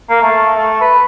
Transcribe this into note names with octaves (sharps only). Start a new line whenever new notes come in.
A#3
A3
A3
B4